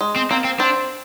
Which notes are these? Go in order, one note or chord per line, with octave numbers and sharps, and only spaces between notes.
G#3
C4
A#3 C4
C4
C4 D4